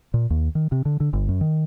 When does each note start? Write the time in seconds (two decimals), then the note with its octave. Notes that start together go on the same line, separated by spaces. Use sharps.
0.14 A#2
0.30 D#2
0.55 D#3
0.72 C3
0.85 D3
1.00 D3
1.13 G1
1.29 F#2
1.41 D#3